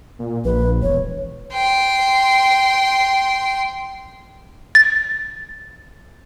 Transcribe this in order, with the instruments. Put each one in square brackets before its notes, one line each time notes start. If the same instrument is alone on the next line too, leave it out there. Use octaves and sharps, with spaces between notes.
[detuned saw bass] A#2
[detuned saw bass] A#1 [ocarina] B4
[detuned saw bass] E1 [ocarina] C#5
[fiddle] G5 C6
[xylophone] A6